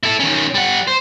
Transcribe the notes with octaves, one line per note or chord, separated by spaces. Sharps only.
E4 A4
D#3 C#4
G3 F#5
C5